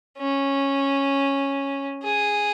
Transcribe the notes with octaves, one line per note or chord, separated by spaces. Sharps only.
C#4
G#4